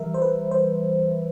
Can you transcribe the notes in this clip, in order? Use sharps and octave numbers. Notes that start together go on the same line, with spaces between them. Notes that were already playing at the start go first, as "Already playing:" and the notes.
Already playing: E3 G3 A#4 E5
C5
B4
C5